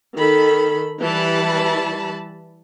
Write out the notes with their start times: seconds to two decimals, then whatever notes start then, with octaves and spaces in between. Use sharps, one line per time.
0.17 D#3 A4 B5
1.00 E3 G3 A5 B5